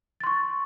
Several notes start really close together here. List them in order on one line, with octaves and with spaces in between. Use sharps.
A6 C6 C#6